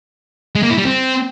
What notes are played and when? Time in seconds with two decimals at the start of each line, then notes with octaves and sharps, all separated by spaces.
0.55 G#3
0.63 A#3
0.70 E4
0.78 G3
0.85 C4